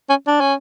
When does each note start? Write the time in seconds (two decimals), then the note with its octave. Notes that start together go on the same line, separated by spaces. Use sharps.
0.09 C#4
0.27 D4
0.40 C#4